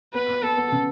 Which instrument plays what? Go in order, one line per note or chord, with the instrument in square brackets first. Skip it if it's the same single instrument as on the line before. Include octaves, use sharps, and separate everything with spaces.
[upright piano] B3 [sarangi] B4
[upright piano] B3
[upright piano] B3 [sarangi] A4
[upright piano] B3
C#3